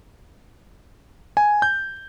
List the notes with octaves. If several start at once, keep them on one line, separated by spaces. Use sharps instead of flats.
G#5
G6